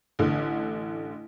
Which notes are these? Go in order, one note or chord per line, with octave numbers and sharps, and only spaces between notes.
A1 D3